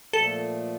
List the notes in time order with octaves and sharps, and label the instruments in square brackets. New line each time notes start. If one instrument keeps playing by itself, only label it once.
[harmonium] A#2 F3 A3 [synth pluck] A4